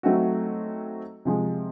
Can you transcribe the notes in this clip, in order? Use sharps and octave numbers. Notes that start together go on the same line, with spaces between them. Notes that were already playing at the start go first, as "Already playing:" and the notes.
F#3 A3 C4 D#4 F#4
C3 F3 G#3